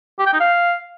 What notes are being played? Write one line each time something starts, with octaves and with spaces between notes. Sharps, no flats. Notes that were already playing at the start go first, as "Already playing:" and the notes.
G4
G5
D#4
F5